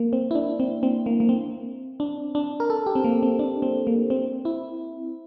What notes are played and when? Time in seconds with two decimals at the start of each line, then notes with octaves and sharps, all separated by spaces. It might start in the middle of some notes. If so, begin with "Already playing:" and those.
Already playing: A#3
0.13 C4
0.31 E4
0.35 D4
0.60 C4
0.83 C4
1.06 A#3
1.20 A#3
1.29 C4
2.00 D4
2.35 D4
2.60 A#4
2.70 A4
2.86 G4
2.95 C4
3.04 A#3
3.23 C4
3.39 D4
3.62 C4
3.87 A#3
4.10 C4
4.45 E4